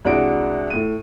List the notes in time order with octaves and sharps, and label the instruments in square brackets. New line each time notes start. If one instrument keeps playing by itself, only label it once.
[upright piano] C2 G#3 D4 F#4 D7
A2 D#7